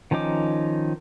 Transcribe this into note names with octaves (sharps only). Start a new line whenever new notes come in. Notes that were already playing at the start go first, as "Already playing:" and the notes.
D#3 F3 C#4 D#4 D6